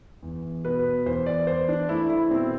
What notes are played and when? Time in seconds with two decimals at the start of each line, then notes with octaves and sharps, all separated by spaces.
0.23 E2
0.65 B2 B4
1.06 E2 C5
1.26 D5
1.47 E2 C5
1.68 D4
1.89 A3 E4
2.10 E4
2.30 B2 C4